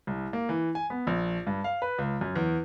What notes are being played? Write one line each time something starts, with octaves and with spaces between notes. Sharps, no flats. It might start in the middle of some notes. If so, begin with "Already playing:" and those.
C2
A#3
E3
G#5
B3
A#1
G2
F5
B4
C#2
F#2
E2